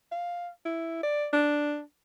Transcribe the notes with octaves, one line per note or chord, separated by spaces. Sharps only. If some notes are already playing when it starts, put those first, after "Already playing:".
F5
E4
D5
D4